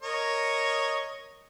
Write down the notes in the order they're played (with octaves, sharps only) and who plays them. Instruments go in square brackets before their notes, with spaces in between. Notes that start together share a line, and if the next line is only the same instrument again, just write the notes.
[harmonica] A#4 C#5 D#5